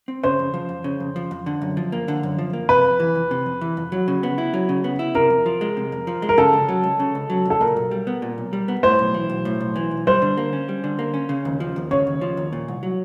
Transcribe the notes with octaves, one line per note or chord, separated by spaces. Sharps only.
C4
C#3 C5
F2
F3
F2
C#3
F2
F3
F2
D3
F#2
F3
A#3
D3
F#2
F3
A#3
C3 B4
F2
E3
F2
C3
F2
E3
F2
F#3
C#3
B3
E4
F#3
C#3
B3
E4
C3 A#4
F2
F3
G#3
C3
F2
F3
G#3
A#4
C#3 A4
C#2
F#3
C#2
C#3
C#2
F#3
C#2 A4
A#2 A#4
B1
G3
B3
A#2
B1
G3
B3
A2 C5
B1
E3
B1
A2
B1
E3
B1
G3 C5
D3
A#3
C#4
G3
D3
A#3
C#4
C#3
D#2
F3
D#2
C#3 C#5
D#2
F3
D#2
A#2
C2
F#3